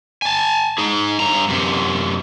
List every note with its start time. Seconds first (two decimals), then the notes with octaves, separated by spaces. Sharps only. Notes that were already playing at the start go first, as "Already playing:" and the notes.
0.22 G#5 A5
0.78 D#4 G#4
1.20 G2 A#5
1.49 F#2 C3